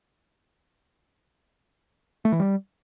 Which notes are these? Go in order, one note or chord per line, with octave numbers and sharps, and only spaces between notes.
A3
E3
G3